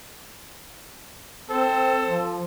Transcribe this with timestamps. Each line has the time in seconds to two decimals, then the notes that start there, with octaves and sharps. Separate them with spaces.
1.50 C4 A4 C5
2.07 F3